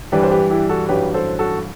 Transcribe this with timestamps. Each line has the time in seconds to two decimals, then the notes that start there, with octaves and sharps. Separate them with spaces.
0.12 G2 E3 G3 D4 G4 B4
0.23 C5
0.31 G4 B4
0.50 E4 G4
0.69 F#4 A4
0.88 A1 G2 F#3 G4 B4
1.14 A4 C5
1.39 F#4 A4